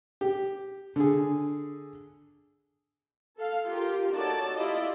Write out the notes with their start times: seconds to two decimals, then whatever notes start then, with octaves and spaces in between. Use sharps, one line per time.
0.21 G4
0.96 D3 G#4
3.38 A4 F5
3.67 F4 G4 A#4
4.14 D#4 F#4 A4 C#5 D5 A5
4.54 E4 F4 G4 D5 D#5